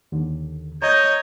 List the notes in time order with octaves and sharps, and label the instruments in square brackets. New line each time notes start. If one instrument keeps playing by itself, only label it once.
[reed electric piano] D#2 D3
[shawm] C#5 [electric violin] D#5 [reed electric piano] A#5 [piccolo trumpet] G6